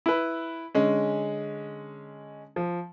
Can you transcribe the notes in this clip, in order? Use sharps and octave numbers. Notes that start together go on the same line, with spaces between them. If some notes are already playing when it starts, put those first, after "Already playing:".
E4 B4
D3 G#3 C#4
F3